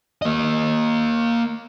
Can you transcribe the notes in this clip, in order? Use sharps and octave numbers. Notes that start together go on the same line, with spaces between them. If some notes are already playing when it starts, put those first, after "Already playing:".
A#3 D#5